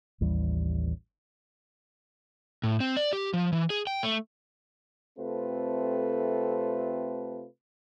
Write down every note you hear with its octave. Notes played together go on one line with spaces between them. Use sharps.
A1 D#2 E3 G3
A2
C4
D5
G4
F3
E3
G#4
G5
A3
C3 A3 C4 F4 A4 B4